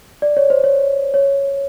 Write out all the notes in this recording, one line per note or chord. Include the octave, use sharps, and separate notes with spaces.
D5
C#5
C5
C#5
C#5